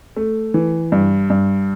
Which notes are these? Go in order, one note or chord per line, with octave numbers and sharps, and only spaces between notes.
A3
E3
G2
G2